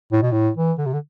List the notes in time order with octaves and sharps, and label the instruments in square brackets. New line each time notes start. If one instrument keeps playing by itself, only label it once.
[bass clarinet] A2
B2
A2
E3
D3
C3
D3